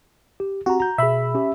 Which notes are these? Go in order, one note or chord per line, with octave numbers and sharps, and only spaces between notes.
G4
C4 F#4 G4 A#5
A#5 G6
B2 G#4 E5 B5
C#4 G4